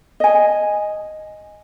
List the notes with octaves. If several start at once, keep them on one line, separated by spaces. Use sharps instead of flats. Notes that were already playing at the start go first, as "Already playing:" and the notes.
D#5 G#5